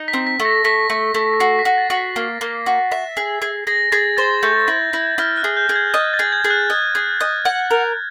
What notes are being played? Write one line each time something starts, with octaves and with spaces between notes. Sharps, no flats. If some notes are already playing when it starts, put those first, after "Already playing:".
Already playing: D#4
B6
C4
B6
A3
A#6
A3 B6
A3
A3
B6
F#4 C7
B6
F#4
A6
F#4
B6
A#3
A#3
F#4
E5
G#4
G#4
G#4 A#6
G#4 A6
C5 A6
A3 G6
E4
E4
E4 F6
F#6
G#4
G6
G#4
G#6
D#5 A6
A6
G#4
G#6
G#4
F#6
D#5
G#4
D#5
F#5
A#4